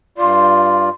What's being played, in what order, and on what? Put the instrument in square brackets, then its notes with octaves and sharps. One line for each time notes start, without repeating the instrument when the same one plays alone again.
[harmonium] G2 F4 D5 [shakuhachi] C6